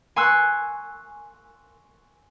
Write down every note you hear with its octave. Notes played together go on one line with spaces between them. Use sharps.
G#5 C6 C#6 E6 F#6